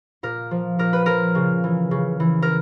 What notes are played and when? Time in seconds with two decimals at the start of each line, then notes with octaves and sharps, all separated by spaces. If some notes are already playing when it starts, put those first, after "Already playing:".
0.23 A#2 A#4
0.51 F3
0.79 A#2 A#4
0.93 B4
1.06 F3 A#4
1.35 C#3
1.64 E3
1.91 C#3
2.20 E3
2.42 A#4